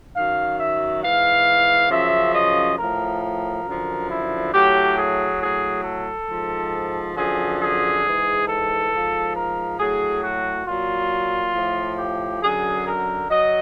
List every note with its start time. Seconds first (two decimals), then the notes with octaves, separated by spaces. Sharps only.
0.15 F#2 D#3 F#3 F5
0.59 E5
1.03 G#2 E3 F5
1.90 F#2 C#3 F3 E5
2.34 D#5
2.78 A2 F3 A#4
3.21 A#4
3.65 F#2 D3 F3
4.10 E4
4.53 A2 F#3 G4
4.98 G#4
5.41 A2 F#3 G#4
5.84 A4
6.29 G#2 F3
7.16 F#2 D3 F3 G#4
7.60 G#4
8.04 G#2 E3
8.48 A4
8.91 G#2 F3
9.35 A#4
9.79 A2 F#3 G#4
10.23 F#4
10.66 A#2 F#3 F4
11.54 A2 F3
11.97 G4
12.41 F#2 D3 F#3 G#4
12.86 A#4
13.29 F#3 D#5